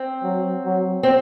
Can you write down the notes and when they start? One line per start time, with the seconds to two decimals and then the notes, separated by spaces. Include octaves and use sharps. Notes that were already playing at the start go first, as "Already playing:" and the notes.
Already playing: C4
0.23 F#3
0.65 F#3
1.03 C4